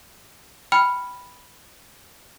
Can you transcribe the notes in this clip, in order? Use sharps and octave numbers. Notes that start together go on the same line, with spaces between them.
G5 B5 F6 C#7